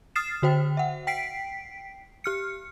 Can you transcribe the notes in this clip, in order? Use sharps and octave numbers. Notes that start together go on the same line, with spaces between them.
D#6 F6 A6 C7 E7
D3 F#4 C5 G5
E5 F#5
G5 B6 C7 D7
G4 F6 C#7